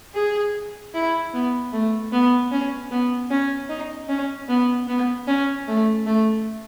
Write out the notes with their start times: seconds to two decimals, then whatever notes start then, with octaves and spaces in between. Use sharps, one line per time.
0.14 G#4
0.94 E4
1.33 B3
1.73 A3
2.12 B3
2.51 C#4
2.90 B3
3.30 C#4
3.69 D#4
4.08 C#4
4.48 B3
4.87 B3
5.27 C#4
5.67 A3
6.06 A3